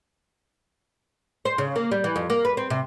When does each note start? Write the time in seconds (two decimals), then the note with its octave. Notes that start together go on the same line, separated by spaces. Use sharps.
1.45 C5
1.58 C#3
1.76 A#3
1.91 G3
2.04 E3
2.16 F2
2.30 A#3
2.45 B4
2.57 C4
2.70 C3